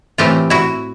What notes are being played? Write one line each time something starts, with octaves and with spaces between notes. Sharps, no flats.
A2 E3 A3 C4 F4 G4
E4 F#4